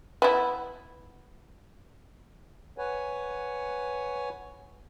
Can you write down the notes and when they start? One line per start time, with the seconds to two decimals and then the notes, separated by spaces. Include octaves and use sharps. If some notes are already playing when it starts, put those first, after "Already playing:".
0.22 B3 E4
2.78 B4 C#5 F#5 G#5